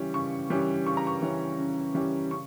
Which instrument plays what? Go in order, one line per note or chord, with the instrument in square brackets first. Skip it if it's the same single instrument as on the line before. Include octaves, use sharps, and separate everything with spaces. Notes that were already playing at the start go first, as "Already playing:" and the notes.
Already playing: [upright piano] C#3 E3 G3 C#4
C#3 C#6
E3 G3 C#4
C#3 C#6
A#5
C#6
E3 G3 C#4
C#3
E3 G3 C#4
C#3 C#6